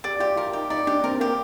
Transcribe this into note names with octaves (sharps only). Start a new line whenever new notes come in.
G4 D5
F4 G4
F4 A#4
D#4 G4
D#4 D5
D4 G4
C4 A#4
A#3 G4